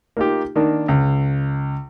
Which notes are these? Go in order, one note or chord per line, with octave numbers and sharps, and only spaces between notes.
A#3 D#4 F4 G4
D#3 A#3 D4
C#2